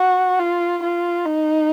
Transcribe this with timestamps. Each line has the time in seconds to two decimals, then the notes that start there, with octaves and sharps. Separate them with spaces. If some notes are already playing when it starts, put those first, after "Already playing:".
Already playing: F#4
0.40 F4
0.83 F4
1.26 D#4